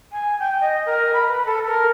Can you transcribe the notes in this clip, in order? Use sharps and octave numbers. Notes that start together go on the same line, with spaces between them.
G#5
G5
D#5
A#4
B5
B4
A4
A#4